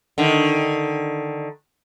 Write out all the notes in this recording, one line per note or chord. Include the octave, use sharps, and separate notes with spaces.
D3 D#3